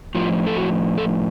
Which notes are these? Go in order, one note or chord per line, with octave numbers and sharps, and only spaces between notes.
A2 F3 F4
A4
F#4
A4